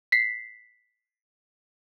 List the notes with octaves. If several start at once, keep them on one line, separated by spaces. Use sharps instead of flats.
B6 C7